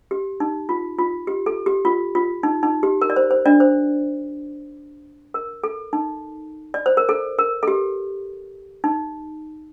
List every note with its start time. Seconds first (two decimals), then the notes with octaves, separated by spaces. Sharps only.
0.11 G4
0.40 D#4
0.69 F4
0.98 F4
1.27 G4
1.46 A4
1.66 G4
1.85 F4
2.15 F4
2.43 D#4
2.63 D#4
2.83 G4
3.01 A#4
3.10 D5
3.16 C5
3.31 C5
3.46 D4 D5
3.60 C5
5.34 A#4
5.63 A4
5.93 D#4
6.74 D5
6.86 C5
6.97 A#4
7.09 A4
7.38 A#4
7.63 A4
7.68 G4
8.84 D#4